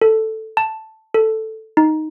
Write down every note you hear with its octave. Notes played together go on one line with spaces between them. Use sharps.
A4
A5
A4
D#4